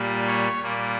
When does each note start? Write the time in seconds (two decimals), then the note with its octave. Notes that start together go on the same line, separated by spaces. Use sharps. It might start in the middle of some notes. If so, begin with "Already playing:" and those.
Already playing: A#2 G3 A#3
0.27 C#5
0.62 A#2 G3 A#3